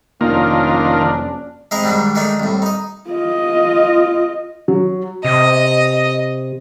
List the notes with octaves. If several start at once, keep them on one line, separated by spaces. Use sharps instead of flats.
F1 D#3 F3 A#3 C#4 D4 F4 A#4
G#3 C4 E4 D#5 A#5
G#2 D#3 G3 D4
D#3 G#3 A3 D4 D#4
C2 A2
D#4 D#5
F4 D#5
F#3
C3 D#5